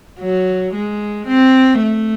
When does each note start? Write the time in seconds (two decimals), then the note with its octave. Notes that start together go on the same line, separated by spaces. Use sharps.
0.20 F#3
0.74 G#3
1.28 C4
1.82 A3